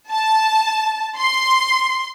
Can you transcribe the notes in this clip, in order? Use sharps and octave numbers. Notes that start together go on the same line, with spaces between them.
A5
C6